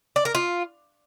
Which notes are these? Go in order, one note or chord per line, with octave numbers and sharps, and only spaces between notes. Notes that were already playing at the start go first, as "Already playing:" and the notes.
D5
A#4
F4